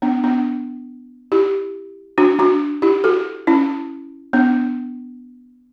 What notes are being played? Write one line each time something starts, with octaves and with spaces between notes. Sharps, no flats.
B3 D4
B3 D4
E4 G4
D4 F#4
D4 F#4
E4 G4
F#4 A4
C#4 E4
B3 D4